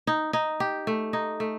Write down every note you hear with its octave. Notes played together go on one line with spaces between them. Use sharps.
D#4
D#4
G4
A3
D#4
A3